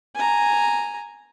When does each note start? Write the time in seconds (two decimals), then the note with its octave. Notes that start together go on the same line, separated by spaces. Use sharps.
0.16 G#5 A#5